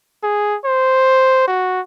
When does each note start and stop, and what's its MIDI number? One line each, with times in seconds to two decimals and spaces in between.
0.23 0.56 68
0.65 1.44 72
1.48 1.81 66